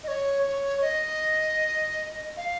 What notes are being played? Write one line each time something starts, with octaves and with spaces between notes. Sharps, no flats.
D#5
C#5
C#5
D#5
F5